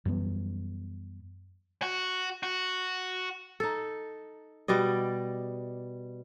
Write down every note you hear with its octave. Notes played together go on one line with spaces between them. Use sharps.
F#2 E3 G3 B3
F#4
F#4
D#4 A4
B2 G3 D5 D#5